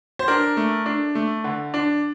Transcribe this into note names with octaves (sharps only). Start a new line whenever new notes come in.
C5
D4 A#4
A3
D4
A3
D3
D4